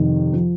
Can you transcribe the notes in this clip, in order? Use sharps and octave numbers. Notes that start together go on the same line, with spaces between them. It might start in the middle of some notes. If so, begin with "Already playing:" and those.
Already playing: F2 C3 D#3
F3